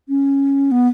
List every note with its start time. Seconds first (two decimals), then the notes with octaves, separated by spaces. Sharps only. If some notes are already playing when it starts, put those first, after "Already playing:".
0.09 C#4
0.72 B3